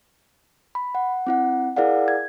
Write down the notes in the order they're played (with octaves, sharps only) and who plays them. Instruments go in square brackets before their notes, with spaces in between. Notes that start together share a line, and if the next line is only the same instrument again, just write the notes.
[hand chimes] B5
F#5
C4 E4 F#5
E4 G#4 A#4 D5 F5 F#5
G#6